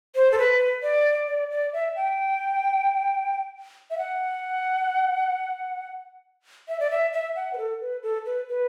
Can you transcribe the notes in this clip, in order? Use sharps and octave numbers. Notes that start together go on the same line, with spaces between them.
C5
A4
B4
D5
D5
D5
E5
G5
E5
F#5
E5
D5
E5
E5
F#5
B4
A4
B4
A4
B4
B4